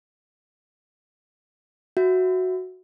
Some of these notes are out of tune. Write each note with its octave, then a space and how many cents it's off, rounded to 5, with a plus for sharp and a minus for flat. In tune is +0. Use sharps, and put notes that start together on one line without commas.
F#4 +0 E5 +0